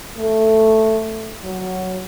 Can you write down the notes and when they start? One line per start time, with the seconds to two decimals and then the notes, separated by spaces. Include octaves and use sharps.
0.17 A3
1.44 F#3